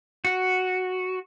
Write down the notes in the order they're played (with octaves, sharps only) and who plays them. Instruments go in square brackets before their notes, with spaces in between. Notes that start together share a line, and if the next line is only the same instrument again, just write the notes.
[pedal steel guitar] F#4